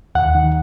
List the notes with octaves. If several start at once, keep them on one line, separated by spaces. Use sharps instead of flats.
D#2 F#5
D#3